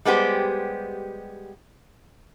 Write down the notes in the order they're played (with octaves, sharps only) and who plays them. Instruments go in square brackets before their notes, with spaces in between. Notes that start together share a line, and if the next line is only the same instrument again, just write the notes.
[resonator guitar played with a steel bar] G3 G#3 B3 G4 C5